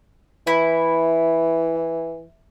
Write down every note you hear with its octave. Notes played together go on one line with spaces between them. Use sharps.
E3 E4